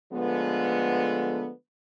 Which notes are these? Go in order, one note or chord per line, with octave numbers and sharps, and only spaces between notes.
D3 F3 G#3 A3 B3